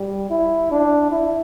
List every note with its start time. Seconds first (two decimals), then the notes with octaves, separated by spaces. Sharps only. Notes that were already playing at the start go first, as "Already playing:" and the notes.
Already playing: G3
0.30 E4
0.72 D4
1.12 E4